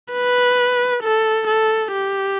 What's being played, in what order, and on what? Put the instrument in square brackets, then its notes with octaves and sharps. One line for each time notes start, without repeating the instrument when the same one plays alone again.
[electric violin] B4
A4
A4
G4